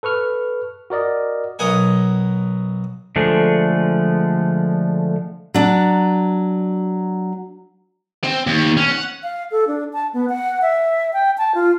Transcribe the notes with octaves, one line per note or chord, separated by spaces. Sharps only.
A4 B4 C#6 F6
F#4 A#4 D5 D#5
B1 A#4 D#5 F#5 G#5
D3 F3 G#3 A3
F#3 D4
C4
D#2
C#4
F#5
F5
A4
D4
A5
B3
F#5
E5
G5
A5
F4